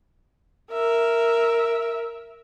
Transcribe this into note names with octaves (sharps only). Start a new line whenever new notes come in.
A#4 E5